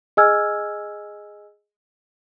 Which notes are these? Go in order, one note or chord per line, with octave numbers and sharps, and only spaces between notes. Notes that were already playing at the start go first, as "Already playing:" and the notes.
G#4 D#5 G#5 E6 F6 G#6